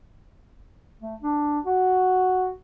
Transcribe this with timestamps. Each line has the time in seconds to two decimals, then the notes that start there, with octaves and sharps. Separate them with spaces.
1.00 A3
1.22 D4
1.65 F#4